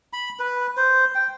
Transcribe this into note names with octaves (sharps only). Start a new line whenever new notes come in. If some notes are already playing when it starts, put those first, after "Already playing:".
B5
B4
C5
G5